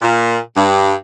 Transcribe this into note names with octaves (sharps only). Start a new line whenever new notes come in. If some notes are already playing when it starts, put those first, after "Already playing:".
A#2
G2